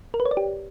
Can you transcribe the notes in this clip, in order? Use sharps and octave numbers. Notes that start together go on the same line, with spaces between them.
A#4
B4
C#5
D5
G4